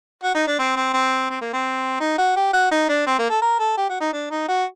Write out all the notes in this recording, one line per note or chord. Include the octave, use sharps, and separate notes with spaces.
F#4
D#4
D4
C4
C4
C4
C4
A#3
C4
D#4
F#4
G4
F#4
D#4
D4
C4
A#3
A4
A#4
A4
G4
F#4
D#4
D4
D#4
F#4